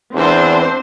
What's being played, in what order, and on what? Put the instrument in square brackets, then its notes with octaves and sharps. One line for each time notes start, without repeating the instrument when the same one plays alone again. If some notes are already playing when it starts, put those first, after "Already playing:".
[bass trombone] E2 [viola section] C4 D4 C5